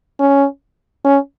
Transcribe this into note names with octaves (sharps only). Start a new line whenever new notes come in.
C#4
C#4